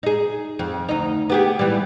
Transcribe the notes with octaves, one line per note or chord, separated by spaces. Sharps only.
D#4 G#4
F2
D2 D#4
B3 G4 G#4
E3 G3